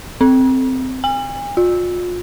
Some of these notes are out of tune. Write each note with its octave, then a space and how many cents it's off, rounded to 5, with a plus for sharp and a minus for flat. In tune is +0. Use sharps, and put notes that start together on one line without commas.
C4 -10
G#5 -40
F4 +35